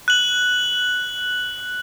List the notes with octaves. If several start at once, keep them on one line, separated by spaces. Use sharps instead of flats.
F#6 F#7